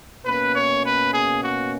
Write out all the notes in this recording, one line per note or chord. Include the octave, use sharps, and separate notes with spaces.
B2 A#3 C#4 B4
C#5
B4
G#4
F#4